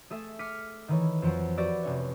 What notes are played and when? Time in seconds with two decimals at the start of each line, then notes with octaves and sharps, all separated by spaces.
0.10 A3 G#4 A4 E5
0.39 D6 F6 B6 C#7 D#7
0.88 D#3 E3 C#5
1.22 F2 F3 F#3
1.57 F#4 G4 B4 D5 E5
1.83 F1 C#4 C#5